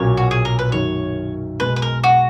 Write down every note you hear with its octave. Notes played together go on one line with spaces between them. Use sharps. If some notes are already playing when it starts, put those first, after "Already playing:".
Already playing: B1 A#2 F#3 A#3 C#4 C#5
F#4
G#4
A#4
B4
F#2 D#3 F#3 C#5
B1 B2 G#3 B4
B4
A#4
F#4